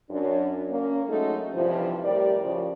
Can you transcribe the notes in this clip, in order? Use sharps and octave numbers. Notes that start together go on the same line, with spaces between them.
F#2 D4
A#3 C#4
F#3 G#3 A3 D#4 A4
G2 C3 E3 F3
A2 G3 G4 A#4 D5
C#3 F3